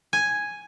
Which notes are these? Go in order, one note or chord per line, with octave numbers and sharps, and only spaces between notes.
G#5